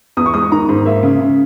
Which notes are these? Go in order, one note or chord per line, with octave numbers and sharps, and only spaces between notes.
E2 D#6
C#6
G#3 D#6
C#6
D#3 A#5
G#2
A#3 E5
C#3
C#3